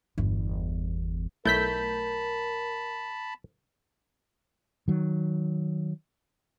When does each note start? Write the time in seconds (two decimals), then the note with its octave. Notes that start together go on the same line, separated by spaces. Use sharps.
0.18 G1 E2
1.45 B1 A3 E4 A#4 A5 B5 G6 B6
4.88 D#3 F#3